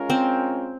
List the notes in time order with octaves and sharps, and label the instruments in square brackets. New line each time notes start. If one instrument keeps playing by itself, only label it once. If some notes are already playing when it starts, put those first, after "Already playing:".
Already playing: [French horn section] G#3 C#4 F4 A#4
[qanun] C4